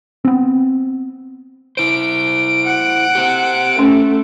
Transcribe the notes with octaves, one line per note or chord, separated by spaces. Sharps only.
B3 C4
E4 C5 D7
F#5
G4 C5
A3 C#4